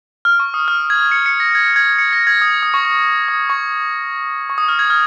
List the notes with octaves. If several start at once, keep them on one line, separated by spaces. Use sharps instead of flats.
F6
C#6
D#6
F6
G#6
C#7
C#7
A#6
G#6
G#6
C#7
A#6
G#6
D#6
D#6
C#6
C#6
D#6
C#6
C#6
D#6
F6
G#6
F6